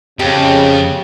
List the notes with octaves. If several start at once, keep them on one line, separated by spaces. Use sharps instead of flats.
F2 C#3 G4